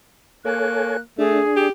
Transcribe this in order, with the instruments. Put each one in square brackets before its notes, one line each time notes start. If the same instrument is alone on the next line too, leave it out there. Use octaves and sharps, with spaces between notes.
[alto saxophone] A#3 [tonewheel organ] A4 C#5 G#5 [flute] F#6
[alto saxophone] A3 [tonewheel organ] D4 [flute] G#4
[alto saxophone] G4